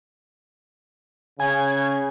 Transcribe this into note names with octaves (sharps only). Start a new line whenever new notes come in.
C#3 G#5 G#6